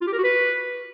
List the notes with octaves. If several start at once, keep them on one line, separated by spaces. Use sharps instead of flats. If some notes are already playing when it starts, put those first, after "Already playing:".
F4
G4
A#4
F#4
B4